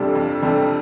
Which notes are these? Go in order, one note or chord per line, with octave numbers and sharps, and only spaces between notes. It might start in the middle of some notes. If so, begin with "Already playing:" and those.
Already playing: F2 C3 G3 D4 A4
F2
C3 G3 D4 A4